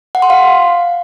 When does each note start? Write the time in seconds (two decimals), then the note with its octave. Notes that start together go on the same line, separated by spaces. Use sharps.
0.15 F#5
0.22 C6
0.30 F5